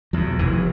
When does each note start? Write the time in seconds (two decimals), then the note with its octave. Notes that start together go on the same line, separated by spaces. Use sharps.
0.13 E2 B2 F3
0.39 F1 E3